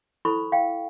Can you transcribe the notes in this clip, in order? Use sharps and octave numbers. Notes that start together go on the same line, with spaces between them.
E4 A4 C5 B5 C#6
F5 G5